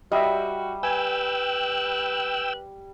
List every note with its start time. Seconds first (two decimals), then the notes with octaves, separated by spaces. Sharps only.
0.12 G3 F#4 D#5 E5
0.83 B4 G5 G#5 E6